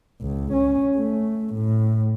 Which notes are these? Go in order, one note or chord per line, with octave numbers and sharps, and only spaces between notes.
C#2
C#4
A3
A2